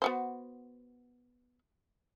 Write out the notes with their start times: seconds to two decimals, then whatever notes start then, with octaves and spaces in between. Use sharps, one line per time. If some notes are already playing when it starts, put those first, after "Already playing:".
0.02 B3 F#4 C5